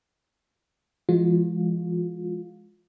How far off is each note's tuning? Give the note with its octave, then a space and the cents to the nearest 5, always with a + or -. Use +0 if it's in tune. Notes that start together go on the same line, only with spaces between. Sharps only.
F3 -45 G#3 +0 F4 +30